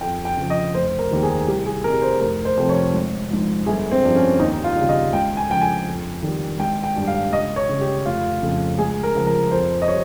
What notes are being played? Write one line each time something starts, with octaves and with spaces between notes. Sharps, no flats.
F2 G5
G5
C#3 F3
D#5
F1 C5
A#4
D#2 D#3 G3
G#4
C2 G4
G#4
C3 G3 A#4
C5
F1 A#4
C5
F2 C3 F3
C#5
G#1
G#2 F3
G1 G#4
C4
G2 F3
C#4
D#2 D#4
F4
C#3 G3
D#5
C#2 G5
G#5
C#3 F3 G5
G#5
F2
D#3 G3
G#1 G5
G5
G2 G3
F5
C#2 D#5
C#5
C#3 G3
G4
F1 F4
F2 C#3 F3
C#2 G#4
A#4
C#3 F3
A#4
F2 C5
D#5
G3 C#5